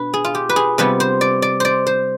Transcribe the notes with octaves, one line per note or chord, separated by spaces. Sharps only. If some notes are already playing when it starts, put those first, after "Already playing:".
Already playing: B2 D4 B4
G#4
F4
G4
B4
G#4
C3 G3 B3 B4
C5
D5
D5
C5 D5
C5